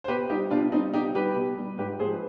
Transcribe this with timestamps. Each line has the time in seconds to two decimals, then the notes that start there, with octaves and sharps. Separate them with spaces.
0.04 C5
0.08 B2 G4 B4
0.30 G3 D#4 G4
0.50 B2 D4 F4
0.72 G3 C4 D#4
0.93 B2 D#4 G4
1.15 G3 G4 B4
1.36 B2
1.57 G3
1.78 G#2 G4 B4
1.99 F3 G#3 G#4 C5
2.12 B4